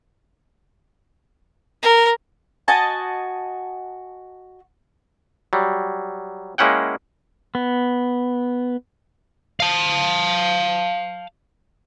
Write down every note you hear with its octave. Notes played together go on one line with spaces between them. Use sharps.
A#4
F#4 D#5 G#5 A5
F#3 G3
G#3 A#3 C#4 E4 F#5 G5
B3
F5 A5